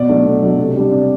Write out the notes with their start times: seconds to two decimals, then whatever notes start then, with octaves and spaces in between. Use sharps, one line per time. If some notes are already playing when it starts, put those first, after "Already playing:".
Already playing: B2 D5
0.08 F#3 A3 D4
0.25 B2
0.42 F#3 A3 D4
0.58 C3
0.75 G3 D4
0.91 C3 D5